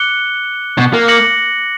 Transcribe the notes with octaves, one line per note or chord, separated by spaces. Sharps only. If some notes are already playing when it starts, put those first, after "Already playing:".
Already playing: D6 F#6 C#7 G7
B2
A#3
D6 A#6 C#7 F#7